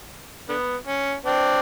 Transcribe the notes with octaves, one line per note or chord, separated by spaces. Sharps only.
D3 B3
C#4
C4 D4